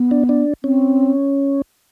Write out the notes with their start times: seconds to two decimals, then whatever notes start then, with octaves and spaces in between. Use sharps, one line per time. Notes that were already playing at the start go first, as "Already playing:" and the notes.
Already playing: B3
0.11 D4
0.29 D4
0.64 C4 C#4